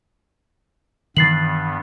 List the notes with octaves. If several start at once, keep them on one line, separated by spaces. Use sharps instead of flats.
G2 D#3 E3 B3 A6 C7 F#7